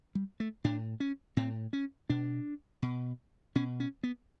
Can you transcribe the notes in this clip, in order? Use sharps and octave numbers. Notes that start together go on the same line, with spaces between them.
G3
A3
A2 D4
C#4
A2 C4
C#4
B2 D4
B2
B2 C#4
C#4
B3